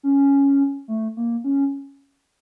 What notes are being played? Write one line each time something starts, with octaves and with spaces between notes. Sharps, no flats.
C#4
A3
A#3
C#4